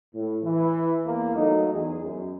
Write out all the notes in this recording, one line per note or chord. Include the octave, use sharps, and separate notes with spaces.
A2
E3
E2 A#3
F#3 A3 D#4
E2 G#4
F#2